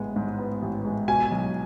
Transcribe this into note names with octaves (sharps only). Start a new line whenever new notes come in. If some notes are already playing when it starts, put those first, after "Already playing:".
Already playing: A1 G#2 G#3 B3
G#2
B3
A1
G#3
B2 G#5
B1